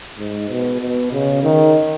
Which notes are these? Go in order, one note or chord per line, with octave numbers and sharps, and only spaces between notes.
G#2
B2
B2
C#3
D#3